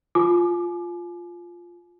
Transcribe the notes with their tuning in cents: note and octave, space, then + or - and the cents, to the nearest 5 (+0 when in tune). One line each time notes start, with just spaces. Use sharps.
F4 +0 G#5 +40 D6 +20